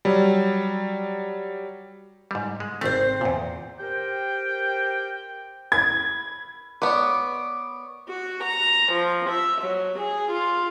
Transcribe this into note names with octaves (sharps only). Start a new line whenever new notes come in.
F#3 G3
G#2 G3
G#3
G#1 A3 C4 C5
E2 A#2
G4 A#4 C5 G5
B5 G#6
B3 B4 C#5 D5 D6
F#4
A#5
F3
E5
F#3
G#4
F4